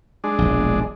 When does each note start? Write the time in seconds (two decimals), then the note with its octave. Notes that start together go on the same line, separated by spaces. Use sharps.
0.24 G#3 D4
0.38 E1 A#1